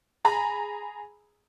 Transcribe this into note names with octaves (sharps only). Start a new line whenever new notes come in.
G#4 G#5 A#5 B5